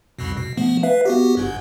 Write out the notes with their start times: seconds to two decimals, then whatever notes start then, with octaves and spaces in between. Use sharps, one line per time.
0.19 C2 F2 B2
0.37 B2
0.57 F3 A3 B3
0.83 B4 E5 F5
1.05 B3 F#4 G4
1.37 G1 G2